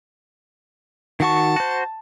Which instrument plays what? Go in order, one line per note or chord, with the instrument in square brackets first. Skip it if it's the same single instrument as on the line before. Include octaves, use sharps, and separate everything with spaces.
[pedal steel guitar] D#3 F#4 C#6 [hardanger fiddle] A5
[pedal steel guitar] F#4 C5